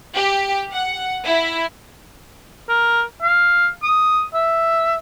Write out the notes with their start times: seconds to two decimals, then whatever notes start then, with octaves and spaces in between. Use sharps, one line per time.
0.15 G4
0.72 F#5
1.24 E4
2.69 A#4
3.22 F5
3.83 D#6
4.34 E5